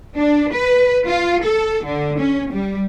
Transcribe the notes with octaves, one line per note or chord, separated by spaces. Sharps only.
D4
B4
F4
A4
D3
C#4
G3